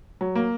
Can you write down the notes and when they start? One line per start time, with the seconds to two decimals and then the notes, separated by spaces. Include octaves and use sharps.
0.21 F#3
0.35 A#3